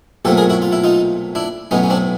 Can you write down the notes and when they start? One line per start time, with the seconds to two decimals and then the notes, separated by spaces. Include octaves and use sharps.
0.25 B1 A#2 F#3 A3 C4 G4 A4
0.37 G#4 A#4
0.50 E4 F#4
0.62 F4
0.72 E4
0.84 D#4 F4
1.35 D4 E4
1.71 B1 A2 F#3 B3 C#4 D#4
1.84 C#4
1.90 C4 D4